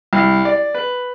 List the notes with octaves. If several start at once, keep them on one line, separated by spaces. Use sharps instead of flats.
C2
D5
B4